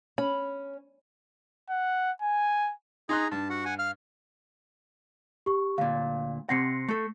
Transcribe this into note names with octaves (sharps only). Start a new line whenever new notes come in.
C#4 B5
F#5
G#5
D#4 G#4 A#5 C6 F#6
G2 A5
F#4 F#5
F#5 G#5
F5 F6
G4 C#6
D2 A#2 F5
C3 C4 F#5 A#6 C7 C#7
A3 A4